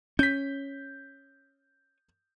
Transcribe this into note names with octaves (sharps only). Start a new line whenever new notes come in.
C#4 G6 B6